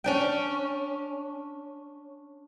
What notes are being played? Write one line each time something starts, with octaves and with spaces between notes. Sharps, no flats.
C#4 D4 G5